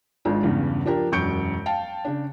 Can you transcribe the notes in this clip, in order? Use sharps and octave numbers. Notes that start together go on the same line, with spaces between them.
G#1 G#3 D4 F4
E2 G2 C#3
F3 D4 G4 A#4
E1 F#2 C#6 G6 C#7 D7
F5 G5 A5
C#3 D4